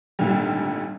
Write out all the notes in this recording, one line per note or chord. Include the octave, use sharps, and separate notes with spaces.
G#1 D2 A#2 D3 D#3 G3